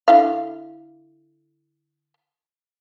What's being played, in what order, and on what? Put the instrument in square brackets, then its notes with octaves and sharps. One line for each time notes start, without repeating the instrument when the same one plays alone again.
[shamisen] D3 E4 F5